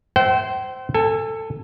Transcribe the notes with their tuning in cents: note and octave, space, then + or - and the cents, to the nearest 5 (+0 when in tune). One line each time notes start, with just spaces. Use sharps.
C5 -5 E5 +0 G5 -40
A4 +15 G#5 -20